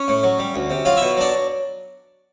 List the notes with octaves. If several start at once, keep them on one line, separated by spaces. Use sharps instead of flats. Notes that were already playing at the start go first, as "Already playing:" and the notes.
Already playing: C#4 C#5
A2
F#3
G3
D2
C3
F#3 F4 F5
B2 E4 E5
F#3 D4 D5